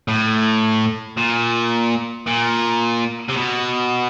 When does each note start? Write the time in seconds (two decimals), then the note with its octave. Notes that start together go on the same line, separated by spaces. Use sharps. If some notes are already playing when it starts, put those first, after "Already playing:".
0.08 A2
1.18 A#2
2.27 A#2
3.28 C3
3.36 B2